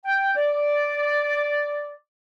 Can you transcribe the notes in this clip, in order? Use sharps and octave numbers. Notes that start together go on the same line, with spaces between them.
G5
D5